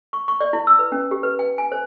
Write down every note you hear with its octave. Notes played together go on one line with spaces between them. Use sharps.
C#6
C#6
D5
E4
E6
B4
C#4
G4
B4
G5
G#5
C5